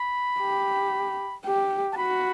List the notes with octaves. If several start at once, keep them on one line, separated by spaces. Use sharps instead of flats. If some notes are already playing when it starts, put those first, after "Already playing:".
Already playing: B5
G4
G4
A5
F#4 B5